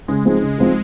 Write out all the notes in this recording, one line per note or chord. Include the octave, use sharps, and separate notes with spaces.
C#3 G#3
F3 C4 D#4 G#4
C#3
F3 C4 D#4 G#4